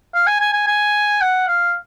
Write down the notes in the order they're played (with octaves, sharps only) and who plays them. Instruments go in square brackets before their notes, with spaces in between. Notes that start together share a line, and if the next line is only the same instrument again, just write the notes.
[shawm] F5
G#5
G#5
G#5
G#5
F#5
F5